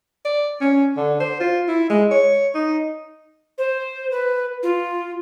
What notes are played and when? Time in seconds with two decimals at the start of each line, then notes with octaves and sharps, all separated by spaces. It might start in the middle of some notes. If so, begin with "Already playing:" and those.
0.25 D5
0.61 C#4
0.97 D3
1.20 C5
1.40 F4
1.68 E4
1.90 G#3
2.11 C#5
2.55 D#4
3.58 C5
4.11 B4
4.63 F4